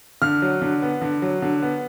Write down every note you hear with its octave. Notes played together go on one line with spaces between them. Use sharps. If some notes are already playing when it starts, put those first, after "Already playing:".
D3 F6
F#3
D3
B3
D3
F#3
D3
B3